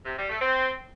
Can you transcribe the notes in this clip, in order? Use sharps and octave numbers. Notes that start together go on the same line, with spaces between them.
C3
G3
A3
C4